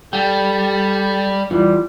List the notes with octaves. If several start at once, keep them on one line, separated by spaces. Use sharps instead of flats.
G3 A4 G5
E2 E3 G3 F4